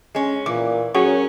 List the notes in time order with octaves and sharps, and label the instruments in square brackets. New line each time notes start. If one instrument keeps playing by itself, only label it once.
[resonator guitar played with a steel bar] G#3 C#4
[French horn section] A#2 [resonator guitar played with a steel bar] E3 [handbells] D6
[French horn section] F#3 A#4 [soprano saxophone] C#4 [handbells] F#4 G#4 C#6 [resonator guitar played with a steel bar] F#5